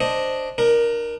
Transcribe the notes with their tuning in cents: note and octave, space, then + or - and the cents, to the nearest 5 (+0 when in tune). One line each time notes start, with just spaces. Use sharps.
D4 +0 C5 +0 D#5 +0
D4 +40 A#4 +10